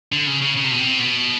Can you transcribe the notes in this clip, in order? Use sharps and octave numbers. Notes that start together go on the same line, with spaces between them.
D3
C#3
C#3
C#3
C3
B2
C3
B2